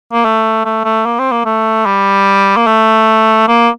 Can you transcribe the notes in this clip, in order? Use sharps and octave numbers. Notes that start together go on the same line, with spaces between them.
A#3
A3
A3
A3
A#3
C4
A#3
A3
G3
A#3
A3
A#3